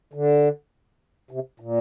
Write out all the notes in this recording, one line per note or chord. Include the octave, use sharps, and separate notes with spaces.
D3
C3
A#2